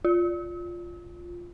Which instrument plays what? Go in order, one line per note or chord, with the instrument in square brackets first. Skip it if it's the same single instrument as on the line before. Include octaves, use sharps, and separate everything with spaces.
[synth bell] F4